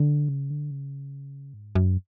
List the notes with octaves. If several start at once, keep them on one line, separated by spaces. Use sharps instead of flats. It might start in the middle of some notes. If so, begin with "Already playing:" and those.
Already playing: D3
C#3
D3
C#3
G#2
F#2